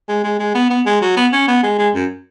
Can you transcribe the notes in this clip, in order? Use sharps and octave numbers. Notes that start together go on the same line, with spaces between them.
G#3
G#3
G#3
B3
B3
G#3
F#3
B3
C#4
B3
G#3
G#3
F#2